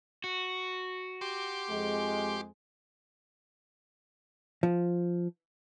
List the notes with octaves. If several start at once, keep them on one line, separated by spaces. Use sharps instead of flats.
F#4
G4 C6 D6
F2 G#3
F3